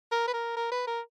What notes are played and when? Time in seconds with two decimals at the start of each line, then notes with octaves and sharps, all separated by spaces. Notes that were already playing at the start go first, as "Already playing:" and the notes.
0.12 A#4
0.28 B4
0.34 A#4
0.57 A#4
0.72 B4
0.87 A#4